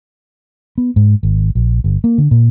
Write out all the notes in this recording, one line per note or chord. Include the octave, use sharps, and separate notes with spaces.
B3
G#2
G#1
A#1
G1
A#3
D3
A#2